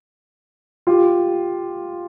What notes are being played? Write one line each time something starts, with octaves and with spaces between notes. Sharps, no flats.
F4 G4